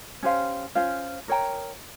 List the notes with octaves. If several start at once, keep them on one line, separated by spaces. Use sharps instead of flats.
C#4 G4 C5 F5
C#4 F4 C5 F5
A#4 C#5 G5 A#5